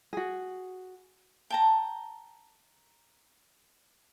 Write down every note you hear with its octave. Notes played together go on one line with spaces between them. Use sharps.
F#4 G#4
G5 A5 A#5